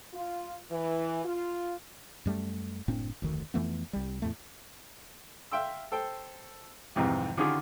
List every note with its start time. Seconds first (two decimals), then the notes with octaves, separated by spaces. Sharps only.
0.14 F4
0.70 E3
1.25 F4
2.26 F#2 G3 A3
2.88 F#1 A2 C4 D4
3.22 F1 D2 D#3
3.54 F2 E3 A3 B3
3.93 C2 G3
4.22 E2 A2 A3
5.52 E5 F5 G5 C6 E6
5.92 A4 C5 G5
6.96 C2 F2 G#2 C3 D#3 E3
7.37 D3 D#3 C#4 F4 G4 G#4